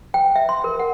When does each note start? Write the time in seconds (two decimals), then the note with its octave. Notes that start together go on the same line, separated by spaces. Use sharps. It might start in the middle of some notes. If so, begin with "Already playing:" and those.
0.14 G5
0.36 E5
0.49 C6
0.64 A#4
0.80 F#5